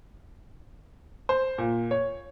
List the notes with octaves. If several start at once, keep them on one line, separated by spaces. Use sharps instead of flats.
C5
A#2
C#5